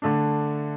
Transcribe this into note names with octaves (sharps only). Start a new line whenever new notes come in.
D3 A3 D4